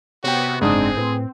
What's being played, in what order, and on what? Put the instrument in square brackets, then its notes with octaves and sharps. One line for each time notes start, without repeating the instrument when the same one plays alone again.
[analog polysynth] C3 B3 [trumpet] F#4 [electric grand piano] C#5 G5
[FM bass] F#1 [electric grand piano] G#2 D4 D#6 [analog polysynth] C4 [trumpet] G#4
[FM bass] A2 [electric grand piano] B4